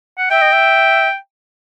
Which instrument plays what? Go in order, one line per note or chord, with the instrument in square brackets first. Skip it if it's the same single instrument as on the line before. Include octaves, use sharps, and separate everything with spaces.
[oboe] F#5
[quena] E5 [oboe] G5
[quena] D#5
E5